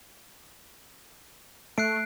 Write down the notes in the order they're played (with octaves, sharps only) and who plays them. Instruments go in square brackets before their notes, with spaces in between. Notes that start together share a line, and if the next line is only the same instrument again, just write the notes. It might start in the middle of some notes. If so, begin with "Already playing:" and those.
[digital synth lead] A3 [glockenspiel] F#6 C7 D7